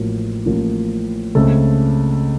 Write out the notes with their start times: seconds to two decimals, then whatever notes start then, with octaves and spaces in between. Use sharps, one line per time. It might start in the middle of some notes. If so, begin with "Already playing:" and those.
Already playing: A1 A2 F3 A#3 F#4
0.46 A1 A2 F3 A#3
1.35 C#2 C#3 A3 C4 A4